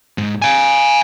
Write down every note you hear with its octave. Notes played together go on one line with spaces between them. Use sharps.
G#2
F5 G#5